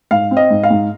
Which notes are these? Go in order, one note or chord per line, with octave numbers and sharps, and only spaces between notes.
G#2 F5
C4
D#5
G#2
F5
G#2